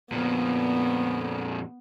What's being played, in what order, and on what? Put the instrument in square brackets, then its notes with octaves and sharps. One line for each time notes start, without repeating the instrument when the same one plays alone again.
[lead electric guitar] F2 A#2 [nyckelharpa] B3